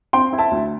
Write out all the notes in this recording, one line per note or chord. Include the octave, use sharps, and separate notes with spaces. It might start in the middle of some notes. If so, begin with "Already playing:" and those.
C4 G5 C6
E4
E5 A5
D2